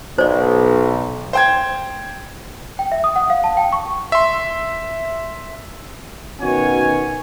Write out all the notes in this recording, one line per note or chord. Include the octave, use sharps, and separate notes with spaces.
B1 C5 D5
C5 G5 G#6
G5
E5
D#6
F#5
F5
A5
G5
C#6
E5 C6
B2 D#3 C#4 F#4 C#5 G#5